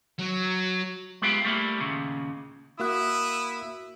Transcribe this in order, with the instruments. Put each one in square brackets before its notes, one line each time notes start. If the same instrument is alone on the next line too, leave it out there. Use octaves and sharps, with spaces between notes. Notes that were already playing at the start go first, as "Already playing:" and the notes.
[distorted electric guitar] F#3
[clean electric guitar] G#3 B3 E4 F4 G4
G3 A3 A#3 E4
D#2 A#2 C#3
[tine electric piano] A#3 F#4 F#6 [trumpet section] E4 E5 D#6